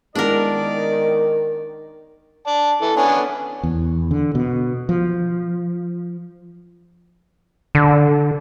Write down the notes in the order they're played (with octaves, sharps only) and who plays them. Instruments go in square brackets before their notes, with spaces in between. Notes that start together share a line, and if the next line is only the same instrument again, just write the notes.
[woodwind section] D#3 [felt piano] G#3 B3 E4 [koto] D4 A#4 [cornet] D5
[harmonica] D5 A5
E3 A4
[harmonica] B3 C#4 D4 [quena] G#5
[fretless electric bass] E2
D3
B2
F3
[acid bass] D3